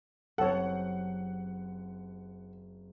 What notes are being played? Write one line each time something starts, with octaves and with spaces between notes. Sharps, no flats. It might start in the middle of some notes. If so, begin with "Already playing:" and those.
F#1 C4 G4 A4 C#5 F#5